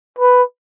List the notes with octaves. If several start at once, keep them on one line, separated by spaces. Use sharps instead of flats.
B4